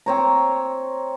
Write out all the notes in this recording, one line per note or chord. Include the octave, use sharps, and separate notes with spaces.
C4 C#5 A#5